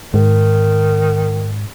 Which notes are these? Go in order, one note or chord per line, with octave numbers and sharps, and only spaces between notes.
G#2 D#3